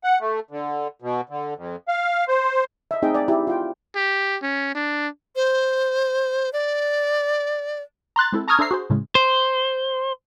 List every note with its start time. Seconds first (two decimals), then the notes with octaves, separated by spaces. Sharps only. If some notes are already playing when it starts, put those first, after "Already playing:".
0.04 F#5
0.21 A3
0.51 D3
1.02 B2
1.29 D3
1.57 F2
1.88 F5
2.28 C5
2.91 D#5 E5
3.02 A3 C4 D#4 G#4 D#5 G5
3.14 D5 G#5
3.28 E4 G4
3.47 F4 G5
3.96 G4
4.42 C#4
4.75 D4
5.36 C5
6.53 D5
8.16 A#5 C6 F#6 A6
8.32 G#3 C4 E4 A4
8.48 A5 A#5 C#6 D#6 F6 G#6
8.59 D4 A4 C5 E5 A#5 C7
8.71 F#4 G#4 C5
8.90 A2 C#3 G#3
9.15 C5